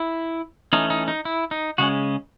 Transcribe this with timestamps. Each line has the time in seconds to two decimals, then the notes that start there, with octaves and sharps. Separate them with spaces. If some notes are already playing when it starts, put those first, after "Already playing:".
Already playing: E4
0.73 E3 A3 C#4 D#4
0.90 D#4
1.08 D#4
1.25 E4
1.51 D#4
1.78 C#3 G#3 C#4 F#4